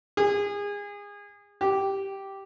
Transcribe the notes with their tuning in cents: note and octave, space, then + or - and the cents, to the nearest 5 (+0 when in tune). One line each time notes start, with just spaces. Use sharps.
G#4 -30
G4 -5